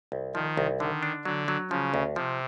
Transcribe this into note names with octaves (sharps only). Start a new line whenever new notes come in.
C2
D#3 F3
C2
D3 D#3
D4
D3 F#3
F#3
C#3 F3
D2
C3 F3